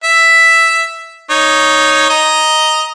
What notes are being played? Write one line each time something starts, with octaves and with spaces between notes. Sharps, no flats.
E5
D#4 C#5
D#5 A#5